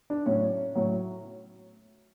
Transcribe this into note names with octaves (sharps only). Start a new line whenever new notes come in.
D4
A2 F#3 C#4
A2 F#3